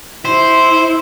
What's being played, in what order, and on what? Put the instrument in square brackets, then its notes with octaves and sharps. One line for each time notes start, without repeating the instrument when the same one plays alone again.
[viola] E4 [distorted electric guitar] C5